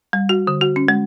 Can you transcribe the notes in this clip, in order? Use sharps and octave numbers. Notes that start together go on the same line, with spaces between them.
G3
F#4
D3
F#4
C#4
G#3